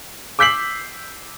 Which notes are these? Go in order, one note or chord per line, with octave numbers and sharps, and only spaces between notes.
D6 E6 G6 B6 C7 F#7